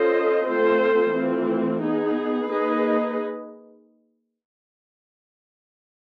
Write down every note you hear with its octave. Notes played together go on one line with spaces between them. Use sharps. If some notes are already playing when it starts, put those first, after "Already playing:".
Already playing: C#4 F4 A4 C5 D#5
A3 C4 F4 A4 C5
E3 A3 C4 F4
B3 D#4 G#4
A#3 D#4 G#4 B4 D#5